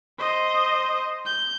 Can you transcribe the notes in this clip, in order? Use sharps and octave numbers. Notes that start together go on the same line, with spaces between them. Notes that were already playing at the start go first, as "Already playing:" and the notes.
C5 D#5
G6